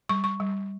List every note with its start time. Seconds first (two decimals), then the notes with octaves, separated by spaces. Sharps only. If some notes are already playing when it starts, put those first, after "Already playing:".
0.09 G3 C#6
0.24 C#6
0.40 G3